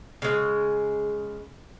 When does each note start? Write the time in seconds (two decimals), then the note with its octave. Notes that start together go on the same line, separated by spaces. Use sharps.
0.22 C#3 G#3